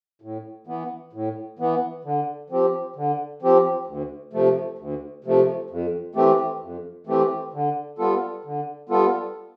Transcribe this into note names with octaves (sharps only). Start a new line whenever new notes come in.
A2
E3 B3
A2
E3 B3
D3
F3 C4 G4
D3
F3 C4 G4
D2
C3 F3 A3
D2
C3 F3 A3
F2
E3 A3 C4 G4
F2
E3 A3 C4 G4
D3
G3 B3 F4 A4
D3
G3 B3 F4 A4